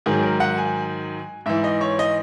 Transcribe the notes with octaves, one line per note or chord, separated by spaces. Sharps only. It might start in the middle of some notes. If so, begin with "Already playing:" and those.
G#2 D#3 F#3 G#4
A#4
F#5
G#5
G#2 E3 E5
D#5
C#5
D#5